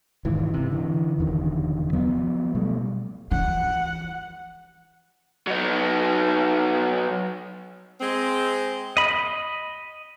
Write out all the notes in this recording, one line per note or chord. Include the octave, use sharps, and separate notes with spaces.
F1 G#2 D#3 E3
C3
D3 E3
F1 E2 D3 D#3
F3 F#3 B3
B2 G3 A3
E3 F#5
F#3 D#4
G#3 C4
D#5 B5